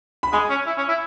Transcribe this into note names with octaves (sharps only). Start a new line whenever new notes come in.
B5
G#3 G#5
C#4
E4
C#4
E4